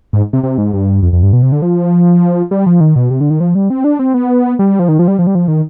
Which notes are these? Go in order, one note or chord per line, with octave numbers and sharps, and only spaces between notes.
G#2
C3
C3
G#2
G2
F2
F2
G2
B2
C3
D3
F3
G3
F3
D#3
B2
C3
D3
D#3
F3
G3
C4
D4
C4
B3
G3
F3
D#3
F3
G3
F3
G3
F3
D#3